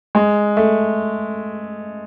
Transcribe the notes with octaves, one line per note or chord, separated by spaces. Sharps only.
G#3
A3